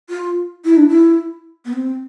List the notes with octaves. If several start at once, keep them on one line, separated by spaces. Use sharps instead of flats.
F4
E4
D4
E4
B3
C4